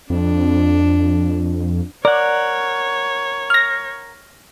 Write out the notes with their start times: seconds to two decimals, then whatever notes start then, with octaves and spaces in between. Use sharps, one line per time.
0.10 F2 D4
2.05 A#4 C#5 D5 F#5
3.50 F6 A#6